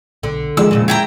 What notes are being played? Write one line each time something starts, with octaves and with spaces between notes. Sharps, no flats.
B1 D3
D#3 F3 G#3 D5 E6
F2 A#2 C#3
E4 G5 A#5